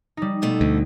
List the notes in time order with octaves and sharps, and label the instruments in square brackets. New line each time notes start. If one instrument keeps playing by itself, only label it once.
[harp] G3 D#4
[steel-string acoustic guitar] B2 A3
[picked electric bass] D2